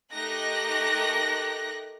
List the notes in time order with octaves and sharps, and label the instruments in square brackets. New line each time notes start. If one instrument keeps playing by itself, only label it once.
[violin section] A3 D#4 G4 A#4 F#6 A#6